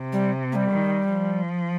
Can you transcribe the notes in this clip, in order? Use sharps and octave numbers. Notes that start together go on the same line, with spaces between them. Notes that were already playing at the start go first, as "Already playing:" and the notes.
Already playing: C3
G3
A#3
G3
D#3
F3